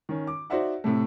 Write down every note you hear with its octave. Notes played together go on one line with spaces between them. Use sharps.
D#3 C#4
D6
D#4 F#4 C5 D5 E5 F#5
A2 C3 A3